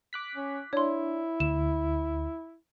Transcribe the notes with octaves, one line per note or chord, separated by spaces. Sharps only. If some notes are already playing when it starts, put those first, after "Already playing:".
D6 F#6 B6
C#4
D4 E4 C#5 C6
D2 E7